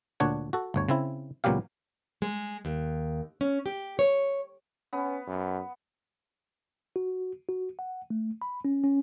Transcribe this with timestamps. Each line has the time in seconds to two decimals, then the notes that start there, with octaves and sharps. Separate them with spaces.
0.20 D2 A#2 D4 C#5 F#5
0.53 F#4 A4
0.74 G1 D2 C#5
0.89 C#3 C4 E4
1.44 C#2 A#2 F#3 B3 G4 F5
2.22 G#3
2.65 D#2
3.41 C#4
3.66 G4
3.99 C#5
4.93 B3 C#4
5.27 F#2
6.96 F#4
7.49 F#4
7.79 F#5
8.10 A3
8.42 B5
8.65 C#4
8.83 C#4